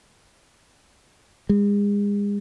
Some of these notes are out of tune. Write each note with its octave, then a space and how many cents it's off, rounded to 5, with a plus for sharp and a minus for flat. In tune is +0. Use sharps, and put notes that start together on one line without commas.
G#3 -35